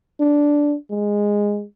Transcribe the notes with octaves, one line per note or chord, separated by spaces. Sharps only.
D4
G#3